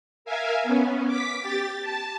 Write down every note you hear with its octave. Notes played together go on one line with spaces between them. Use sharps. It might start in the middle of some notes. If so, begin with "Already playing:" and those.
A#4 E5 F5 G#5
B3 C#4
D6 B6
G4 A6
A5